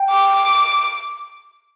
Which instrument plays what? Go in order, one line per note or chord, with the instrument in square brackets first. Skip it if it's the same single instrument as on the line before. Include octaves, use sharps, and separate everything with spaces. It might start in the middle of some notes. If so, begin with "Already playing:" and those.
Already playing: [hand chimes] G5
[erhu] D6